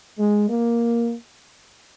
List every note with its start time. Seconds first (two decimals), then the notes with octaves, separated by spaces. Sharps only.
0.18 G#3
0.49 A#3